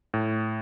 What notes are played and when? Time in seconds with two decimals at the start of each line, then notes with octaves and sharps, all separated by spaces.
0.14 A2